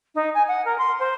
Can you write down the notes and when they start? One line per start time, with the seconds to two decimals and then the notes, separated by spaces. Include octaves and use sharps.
0.14 D#4
0.34 G#5
0.48 F#5
0.65 A#4
0.78 C6
0.99 C5